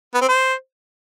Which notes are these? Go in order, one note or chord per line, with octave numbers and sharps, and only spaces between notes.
B3
C4
C5